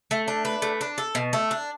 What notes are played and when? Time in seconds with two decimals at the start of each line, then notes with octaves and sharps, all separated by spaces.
0.11 A3
0.28 D4
0.45 B4
0.62 A3
0.81 D4
0.98 A4
1.15 B2
1.33 A3
1.51 D4